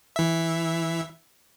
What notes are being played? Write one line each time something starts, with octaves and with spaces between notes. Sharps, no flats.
E3 E5